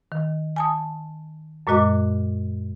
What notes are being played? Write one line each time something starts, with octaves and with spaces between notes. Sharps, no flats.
D#3
G#5 A5 D#6
F#2 A#2 G#3 F#4 D#5 D6